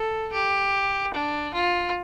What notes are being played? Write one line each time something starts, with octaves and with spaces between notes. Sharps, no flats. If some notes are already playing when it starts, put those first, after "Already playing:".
Already playing: A4
G4
D4
F4